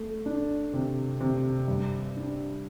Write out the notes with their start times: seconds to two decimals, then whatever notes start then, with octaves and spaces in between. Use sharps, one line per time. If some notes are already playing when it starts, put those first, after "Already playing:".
Already playing: A3
0.26 D4
0.73 C3
1.20 C3
1.68 G2
2.16 D4